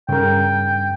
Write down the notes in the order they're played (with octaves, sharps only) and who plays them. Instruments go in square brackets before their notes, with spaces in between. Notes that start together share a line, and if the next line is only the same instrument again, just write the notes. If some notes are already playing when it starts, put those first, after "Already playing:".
[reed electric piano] G2 [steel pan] C#3 A#4 [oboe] G5